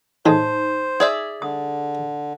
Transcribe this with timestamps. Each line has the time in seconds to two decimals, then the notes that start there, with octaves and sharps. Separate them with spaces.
0.26 A2 G#3 D#4 C5 D#6
1.00 G#4 D5 E5
1.42 D3 D#6